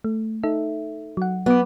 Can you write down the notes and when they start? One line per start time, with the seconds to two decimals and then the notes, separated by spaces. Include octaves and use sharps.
0.04 A3
0.43 D#4 A4 E5
1.17 F#3 F#5
1.46 F#3 B3 D6